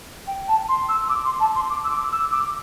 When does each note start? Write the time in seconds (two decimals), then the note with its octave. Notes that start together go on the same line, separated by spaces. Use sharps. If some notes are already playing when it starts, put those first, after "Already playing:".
0.27 G5
0.48 A5
0.69 C6
0.89 E6
1.09 D6
1.25 C6
1.40 A5
1.55 C6
1.70 D6
1.84 E6
1.90 D6
2.12 E6
2.32 D6